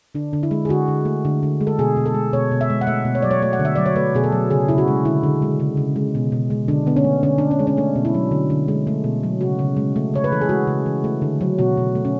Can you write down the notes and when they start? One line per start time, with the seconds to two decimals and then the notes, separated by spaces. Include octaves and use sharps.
0.15 D3 D4
0.33 D3
0.43 E4
0.51 G#3
0.65 G#4
0.69 D3 F#4
0.88 D3
1.05 A3
1.25 D3
1.43 D3
1.61 G#3
1.67 A4
1.79 B2 G#4
1.97 B2
2.06 A4
2.14 G#3
2.33 B2 C#5
2.51 B2
2.61 E5
2.70 G#3
2.81 F#5
2.87 A3 E5
3.05 B2
3.15 C#5
3.22 F#3 D5
3.31 C#5
3.42 A3 C#5
3.53 F#5
3.59 D3
3.65 E5
3.76 F#3 D5
3.86 C#5
3.96 A3 B4
4.14 B2 G#4
4.24 A4
4.32 F#3
4.51 C#3 G#4
4.68 C#3 E4
4.78 F#4
4.88 G#3
5.05 D3 E4
5.23 D3
5.42 G#3
5.60 C#3
5.77 C#3
5.96 G#3
6.15 B2
6.32 B2
6.50 G#3
6.68 D3 D4
6.87 D3 B3
6.96 C#4
7.04 A3
7.23 D3 C#4
7.38 D3 D4
7.51 C#4
7.59 G#3
7.67 C#4
7.77 A3 D4
7.95 B2
8.05 E4
8.14 F#3
8.31 D3
8.50 D3
8.68 G#3
8.87 A3
9.04 B2
9.23 F#3
9.41 C#3 F#4
9.59 C#3
9.77 G#3
9.96 A3
10.14 C#3 C#5
10.24 B4
10.32 E3 A4
10.41 G#4
10.49 G#3 F#4
10.67 C#3
10.86 E3
11.04 A3
11.22 D3
11.41 F#3
11.58 B2 F#4
11.77 B2
11.95 A3
12.05 C#4